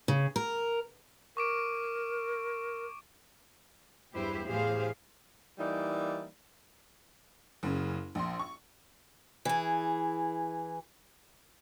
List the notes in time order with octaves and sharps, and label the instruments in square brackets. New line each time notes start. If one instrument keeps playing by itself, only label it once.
[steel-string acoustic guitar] C#3
A#4
[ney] A#4 [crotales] C#6 D6 D7
[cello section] E2 G2 E4 G4 B4 C5
A2 E3 G4 G#4 C5 F5
[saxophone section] E3 G3 A#3 D#4 D5
[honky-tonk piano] F#1 C#3
A#1 C6
C#6
[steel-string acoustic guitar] E3 G#4